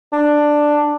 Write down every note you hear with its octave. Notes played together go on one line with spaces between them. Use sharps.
D4